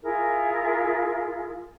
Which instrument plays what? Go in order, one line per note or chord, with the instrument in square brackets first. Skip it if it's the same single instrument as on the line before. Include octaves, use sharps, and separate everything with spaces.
[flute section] E4 F4 G#4 A#4